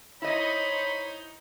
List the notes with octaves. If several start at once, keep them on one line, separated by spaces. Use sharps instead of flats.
D#4 E4 C5 C#5 D#5 B5